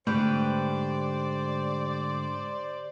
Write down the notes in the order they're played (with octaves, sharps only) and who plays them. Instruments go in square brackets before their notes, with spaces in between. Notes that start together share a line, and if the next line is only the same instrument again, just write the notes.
[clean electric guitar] G#2 D3 [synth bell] A3 [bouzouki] G4 B4 [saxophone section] C5 D5